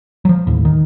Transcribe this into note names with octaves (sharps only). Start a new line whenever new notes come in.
F3 F#3
D#2 A2
D#3